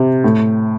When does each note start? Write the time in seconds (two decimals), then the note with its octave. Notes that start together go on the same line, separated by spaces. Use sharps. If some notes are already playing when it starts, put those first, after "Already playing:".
Already playing: C3
0.24 A2